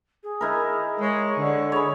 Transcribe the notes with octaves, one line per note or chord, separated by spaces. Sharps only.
G#4
D#4 E4 A#4
G#3 C#5
D3
G#4 C#5 B5